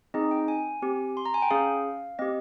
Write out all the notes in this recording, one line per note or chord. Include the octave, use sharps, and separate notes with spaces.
C4 D#4 G#4 D#5
G5
G#5
C4 G4
C6
A#5
G#5
G5
C#4 G#4 F5
C4 G4 D#5